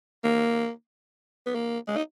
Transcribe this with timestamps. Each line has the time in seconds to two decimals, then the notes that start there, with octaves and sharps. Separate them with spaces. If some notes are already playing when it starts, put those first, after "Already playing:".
0.24 A#3
1.46 B3
1.55 A#3
1.88 G#3
1.96 D#4